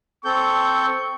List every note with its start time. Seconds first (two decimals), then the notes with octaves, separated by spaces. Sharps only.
0.25 C4 A4 C#6 G6